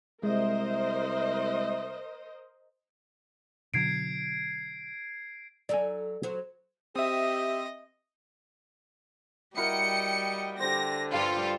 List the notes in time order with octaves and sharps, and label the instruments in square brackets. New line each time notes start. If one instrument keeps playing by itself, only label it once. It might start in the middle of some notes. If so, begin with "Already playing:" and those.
[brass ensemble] C2 E5 [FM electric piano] G#3 [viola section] A#4 C5 D#5
[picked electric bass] B2 D3 F#3 [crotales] G#6 C7 D7
[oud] F#3 D#4 A4 [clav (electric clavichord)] D5 G#5
[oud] F#3 C5
[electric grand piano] C4 E5 [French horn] G4 [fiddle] D#5 D#6
[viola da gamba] G3 [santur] E4 F#4 A#4 [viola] D#5 G5 [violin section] C#7
[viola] D3 [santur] G4 C5 [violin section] A#6
[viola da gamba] G2 G3 A4 [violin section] F4